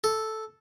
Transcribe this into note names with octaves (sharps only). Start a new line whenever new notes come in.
A4